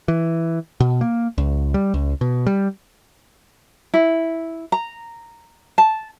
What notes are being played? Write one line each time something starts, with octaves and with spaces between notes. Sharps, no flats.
E3
B2
A#3
C#2
G3
C#2
B2
G3
E4
A#5
A5